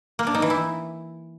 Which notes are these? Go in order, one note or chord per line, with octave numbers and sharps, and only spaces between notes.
A#3
D4
D#4
E3
E4